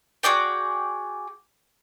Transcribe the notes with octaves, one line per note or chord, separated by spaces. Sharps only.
F#4 G#4 D5 G5